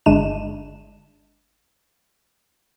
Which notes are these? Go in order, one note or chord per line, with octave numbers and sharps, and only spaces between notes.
G1 G#3 D4 D#7 E7